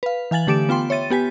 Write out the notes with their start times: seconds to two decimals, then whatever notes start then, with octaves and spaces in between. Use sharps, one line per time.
0.03 B4 F5
0.31 E3 F5 G#5 A6 F#7
0.47 D3 A3 G4 D6 D7 E7
0.69 B3 F4 G5 C6
0.90 C#5 E5 A6 D#7
1.10 B3 G4 G#5 B6